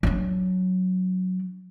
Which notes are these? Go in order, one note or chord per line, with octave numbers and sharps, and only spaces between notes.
F#3 D4